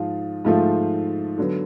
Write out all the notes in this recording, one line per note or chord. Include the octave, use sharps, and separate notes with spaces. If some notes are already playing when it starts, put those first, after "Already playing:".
Already playing: G#2 F3 F4
G#2 F3 A3 F4
D3 F#3 B3